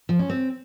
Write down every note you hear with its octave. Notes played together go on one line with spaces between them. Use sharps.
F3
C#4
C4